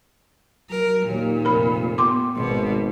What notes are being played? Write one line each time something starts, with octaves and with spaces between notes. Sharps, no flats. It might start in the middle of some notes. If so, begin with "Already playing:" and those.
F#3 A#4
D#2 A#2
F1 A#4 B5
B3 C6 D6
G#1 B2